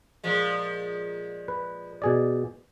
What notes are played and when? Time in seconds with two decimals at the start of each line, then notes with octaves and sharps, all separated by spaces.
0.24 A#2 F3 G#3
1.48 B4
2.02 B2 G#4 D5